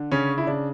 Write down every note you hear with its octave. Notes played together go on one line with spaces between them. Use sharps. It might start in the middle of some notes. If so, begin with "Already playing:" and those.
Already playing: D3
C#3 C#4
E4
C#3 D4